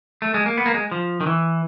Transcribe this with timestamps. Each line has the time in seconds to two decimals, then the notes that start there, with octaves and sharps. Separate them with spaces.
0.22 A3
0.34 G#3
0.46 A#3
0.58 B3
0.66 A#3
0.74 G#3
0.92 F3
1.21 D#3
1.26 E3